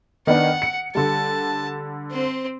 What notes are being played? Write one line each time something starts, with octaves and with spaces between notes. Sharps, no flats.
D#3 B3 D4 F#5
C#7
D3 G3 A5
C4 C5